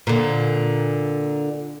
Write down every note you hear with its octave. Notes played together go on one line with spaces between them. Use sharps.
A#2 D3